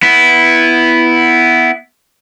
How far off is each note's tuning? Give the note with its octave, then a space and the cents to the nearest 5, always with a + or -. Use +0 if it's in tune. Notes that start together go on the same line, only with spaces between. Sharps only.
B3 +0 E4 +0